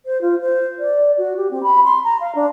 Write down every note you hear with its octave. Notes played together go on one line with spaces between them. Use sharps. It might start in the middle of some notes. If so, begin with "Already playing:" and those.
C5
F4
C5
D5
F#4
G4
C4
B5
C6
A#5
F5
D4